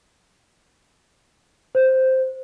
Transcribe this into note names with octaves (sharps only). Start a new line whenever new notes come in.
C5